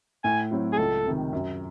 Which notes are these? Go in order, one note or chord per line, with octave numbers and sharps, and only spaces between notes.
A2 G#5
F#3 C4 E4
G#4
C#2 A4
C3 D#3
F#2